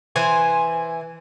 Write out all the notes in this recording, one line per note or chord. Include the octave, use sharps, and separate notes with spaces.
E3 C5 G#5